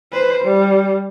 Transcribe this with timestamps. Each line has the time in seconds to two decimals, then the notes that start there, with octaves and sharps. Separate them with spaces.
0.12 B4 C5
0.45 G3